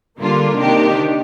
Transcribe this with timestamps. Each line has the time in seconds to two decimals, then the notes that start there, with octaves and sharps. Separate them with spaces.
0.19 D3 G3 A#3 D4 F4
0.56 C3 D#3 A#3 D4 G4